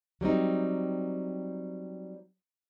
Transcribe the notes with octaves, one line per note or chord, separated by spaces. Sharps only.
F#3 G3 C4 D#4